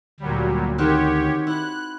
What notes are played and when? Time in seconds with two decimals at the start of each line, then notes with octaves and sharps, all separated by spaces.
0.20 D2 A#2 F#3 G3
0.78 D#3 C4 F#4 G4 C#5
1.47 E4 F#6